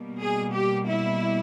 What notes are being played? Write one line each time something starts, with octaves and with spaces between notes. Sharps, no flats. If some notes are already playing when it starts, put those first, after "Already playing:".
Already playing: B2 G3 A#3
G#4
G4
E4